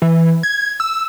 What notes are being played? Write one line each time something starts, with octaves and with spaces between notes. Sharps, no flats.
E3
G#6
E6